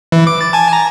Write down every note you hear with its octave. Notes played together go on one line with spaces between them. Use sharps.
E3
D6
A6
G#5 A5
A#5